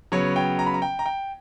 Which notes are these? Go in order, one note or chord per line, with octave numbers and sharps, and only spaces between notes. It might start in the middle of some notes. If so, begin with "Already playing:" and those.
C#3 F#3 B3 C#5
G5
A#5
B5
A#5
G5
A#5
G5